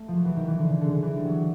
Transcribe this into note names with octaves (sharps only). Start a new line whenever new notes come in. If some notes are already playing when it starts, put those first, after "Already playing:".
Already playing: A3
F3
F#3
E3
D#3
E3
D3
C#3
D3
D3
E3
G3
F#3